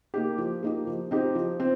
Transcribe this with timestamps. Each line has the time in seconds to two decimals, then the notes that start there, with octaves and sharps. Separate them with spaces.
0.14 A#3 D#4 G4
0.38 F3
0.63 A#3 D#4 G4
0.87 F3
1.11 C4 D#4 G4
1.35 F3
1.60 C4